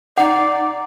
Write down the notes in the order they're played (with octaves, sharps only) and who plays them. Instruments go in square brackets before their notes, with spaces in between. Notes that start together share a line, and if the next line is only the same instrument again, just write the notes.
[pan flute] D#4 [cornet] D5 [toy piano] F#5